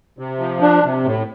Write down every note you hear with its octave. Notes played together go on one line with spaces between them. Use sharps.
C3
F3
D4
C3
A2